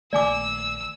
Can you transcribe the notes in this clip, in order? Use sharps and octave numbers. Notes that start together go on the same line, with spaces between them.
A#1 D#3 A3 D5 G#5 D6 E6